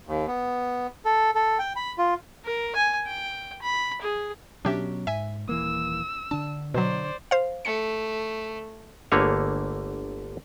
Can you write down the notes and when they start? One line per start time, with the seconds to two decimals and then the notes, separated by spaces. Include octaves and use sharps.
0.07 D#2
0.28 B3
1.05 A4
1.35 A4
1.59 G5
1.76 B5
1.98 F4
2.45 A#4
2.75 G#5
3.07 G5
3.62 B5
4.02 G#4
4.65 B2 F#3 C#4 D4 G4 E5
5.07 G#2 E5 G#5
5.49 D#1 E3 A#3 E6
6.31 D3 D4 A5
6.74 B2 F#3 C5 D5
7.31 C5 F5
7.65 A3 C#7
9.12 G1 D3 A3 A#3 G#4 C#5